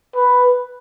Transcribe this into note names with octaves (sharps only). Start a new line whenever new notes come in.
B4